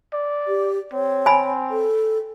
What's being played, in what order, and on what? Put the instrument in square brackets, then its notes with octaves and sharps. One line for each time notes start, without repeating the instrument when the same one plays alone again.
[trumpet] D5
[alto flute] G4
[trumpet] C4 [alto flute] C#5
[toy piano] G#5 B5
[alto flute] A4